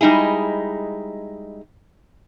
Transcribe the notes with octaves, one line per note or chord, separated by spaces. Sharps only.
G3 G#3 D#4 E4 G#4